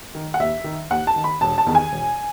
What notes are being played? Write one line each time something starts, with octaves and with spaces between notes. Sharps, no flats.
D#3
F#5
D#2 E5
D#3
D#2 F#5
A5
D#3
B5
E1 A5
A5
E2 D#3
G#5
E1